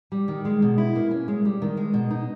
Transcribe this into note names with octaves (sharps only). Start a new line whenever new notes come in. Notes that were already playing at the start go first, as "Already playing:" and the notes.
G3
D#3
G#3
B2
E4
A#3
C#4
G#3
G3
D#3
G#3
B2
D#4